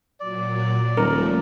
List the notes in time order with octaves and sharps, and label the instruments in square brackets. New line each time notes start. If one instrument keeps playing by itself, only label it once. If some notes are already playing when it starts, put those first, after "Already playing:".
[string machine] A#2 F#3 [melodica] D5
[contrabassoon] D#1 [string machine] F3 A3 [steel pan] A#4